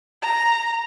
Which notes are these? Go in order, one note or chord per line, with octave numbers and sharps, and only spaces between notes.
A#5